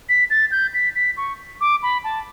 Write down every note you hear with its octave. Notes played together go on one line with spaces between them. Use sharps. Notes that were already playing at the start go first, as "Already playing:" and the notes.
B6
A6
G6
B6
B6
C#6
D6
B5
A5